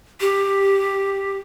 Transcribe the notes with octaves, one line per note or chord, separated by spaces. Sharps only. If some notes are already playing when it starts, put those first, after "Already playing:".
G4